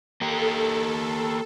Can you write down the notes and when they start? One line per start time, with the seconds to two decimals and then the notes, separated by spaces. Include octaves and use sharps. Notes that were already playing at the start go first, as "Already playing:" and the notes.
0.21 A#3 G4 A4